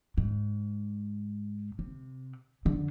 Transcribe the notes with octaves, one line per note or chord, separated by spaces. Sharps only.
G#2
C3
F2 D3